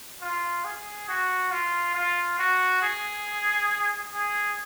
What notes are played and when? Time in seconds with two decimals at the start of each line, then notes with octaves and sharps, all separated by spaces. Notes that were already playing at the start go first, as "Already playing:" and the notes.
0.22 F4
0.65 G#4
1.09 F#4
1.51 F4
1.95 F4
2.39 F#4
2.82 G#4
4.13 G#4